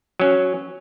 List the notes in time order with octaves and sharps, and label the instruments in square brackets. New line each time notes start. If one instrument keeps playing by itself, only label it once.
[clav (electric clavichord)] F#3 C#4